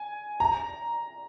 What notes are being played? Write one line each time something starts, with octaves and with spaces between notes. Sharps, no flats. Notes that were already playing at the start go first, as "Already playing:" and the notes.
Already playing: G#5
A#5